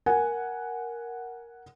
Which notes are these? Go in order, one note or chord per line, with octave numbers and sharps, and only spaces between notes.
A#4 F#5 G#5